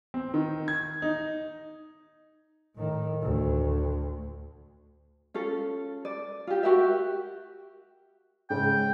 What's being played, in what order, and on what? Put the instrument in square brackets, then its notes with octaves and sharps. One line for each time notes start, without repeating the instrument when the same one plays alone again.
[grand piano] C4
D#3
G#6
D#4
[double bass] A2 D#3
D2
[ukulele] C#4 F4 A4
D5
F4 G4
F#4 G4 A#4 E5
[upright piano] G#2 C#3 [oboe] G5